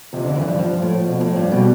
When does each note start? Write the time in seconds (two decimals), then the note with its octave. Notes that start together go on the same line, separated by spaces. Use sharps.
0.13 F2 C3
0.24 F2 D3
0.36 G2 E3
0.48 G2 F3
0.59 G2
0.70 G2
0.82 A2
1.06 B2
1.21 A2
1.36 G2
1.52 B2 G3